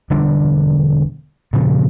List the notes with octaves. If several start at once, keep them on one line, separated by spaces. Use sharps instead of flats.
E1 D3 G3 D4
G2 A#2 C#3 F3